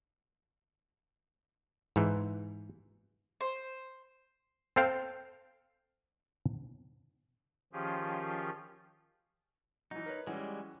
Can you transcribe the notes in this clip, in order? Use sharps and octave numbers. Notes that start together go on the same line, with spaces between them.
G#2 E3
C5
C4 A4 C5 F5 G5
D#3 F3 C#4 F4 G4 G#4
E3 F#3 D#4
A#4 B4 C#5
E3 G3 G#3 C#4 F#4